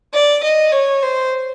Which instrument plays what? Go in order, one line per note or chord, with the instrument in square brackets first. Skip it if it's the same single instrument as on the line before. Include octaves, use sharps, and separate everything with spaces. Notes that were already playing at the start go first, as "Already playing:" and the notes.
[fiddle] D5
D#5
C#5
C5